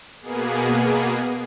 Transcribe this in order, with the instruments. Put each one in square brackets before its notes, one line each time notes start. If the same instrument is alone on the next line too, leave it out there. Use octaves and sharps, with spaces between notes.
[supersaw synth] B2 A#3 B3 G#4